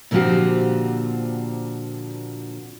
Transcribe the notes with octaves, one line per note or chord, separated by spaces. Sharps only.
A#2 D3 F3 C4 F#4 G4